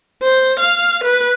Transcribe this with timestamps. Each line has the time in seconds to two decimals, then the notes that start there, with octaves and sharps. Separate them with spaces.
0.22 C5
0.59 F5
1.04 B4